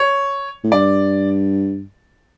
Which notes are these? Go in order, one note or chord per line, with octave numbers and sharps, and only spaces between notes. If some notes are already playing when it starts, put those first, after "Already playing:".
Already playing: C#5
A2
G2 D5